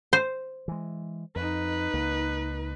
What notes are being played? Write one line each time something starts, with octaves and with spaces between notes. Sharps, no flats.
C5
E3 G#3
F2 D#4 B4
C#2 A#3